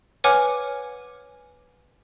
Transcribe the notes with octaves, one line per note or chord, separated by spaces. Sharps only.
B4 C#5 F#5 G#5 D6 F6